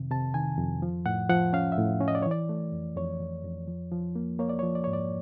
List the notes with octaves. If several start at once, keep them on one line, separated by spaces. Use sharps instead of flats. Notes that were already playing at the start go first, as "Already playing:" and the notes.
Already playing: F2 C3 D#3
C3 A5
D#3 G#5
F2
F3
A2 F#5
F3 F#5
C#4 F5
E5
A2
C#4
D#5
D5
C#5
E3
D5
A3
F2
F2 C#5
F2
F2
F3
F3
A#3
A#3 C#5
D5
F3 C#5
D5
G#2 C#5
D5